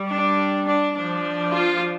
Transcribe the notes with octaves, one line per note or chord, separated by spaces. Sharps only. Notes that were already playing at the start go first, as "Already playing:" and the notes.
Already playing: G3
D4
D4
F3 D4
F4